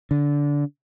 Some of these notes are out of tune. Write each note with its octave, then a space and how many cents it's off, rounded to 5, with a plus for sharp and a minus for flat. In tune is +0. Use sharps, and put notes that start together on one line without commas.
D3 -20